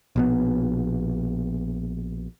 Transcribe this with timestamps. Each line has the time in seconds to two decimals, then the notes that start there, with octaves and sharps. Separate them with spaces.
0.16 A#1 B2 B3